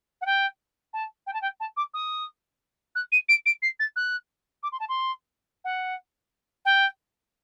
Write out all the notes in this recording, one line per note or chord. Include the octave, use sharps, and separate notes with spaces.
F#5
G5
A5
G5
A5
G5
A5
D6
D#6
F#6
D#7
D7
D7
C7
A6
F#6
D6
C6
A5
C6
F#5
G5